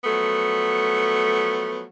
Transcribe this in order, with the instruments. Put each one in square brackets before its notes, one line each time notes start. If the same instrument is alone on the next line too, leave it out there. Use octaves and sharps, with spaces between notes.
[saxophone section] F3 F#3 A3 B3